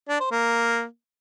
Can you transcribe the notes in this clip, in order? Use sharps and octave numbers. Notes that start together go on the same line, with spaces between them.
D4
C5
A#3